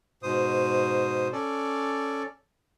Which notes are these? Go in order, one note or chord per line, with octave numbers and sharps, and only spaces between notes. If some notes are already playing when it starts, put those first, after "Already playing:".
G#2 B2 C5 D#6
C#4 A4 D5